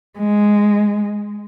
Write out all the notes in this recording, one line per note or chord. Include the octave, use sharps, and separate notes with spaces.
G#3